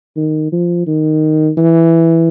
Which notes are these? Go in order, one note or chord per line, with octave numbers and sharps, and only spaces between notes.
D#3
F3
D#3
E3